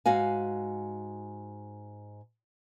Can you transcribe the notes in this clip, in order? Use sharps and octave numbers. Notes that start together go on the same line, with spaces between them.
G#2 F#4 F5 G#5